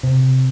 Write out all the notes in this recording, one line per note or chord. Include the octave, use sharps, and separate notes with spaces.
C3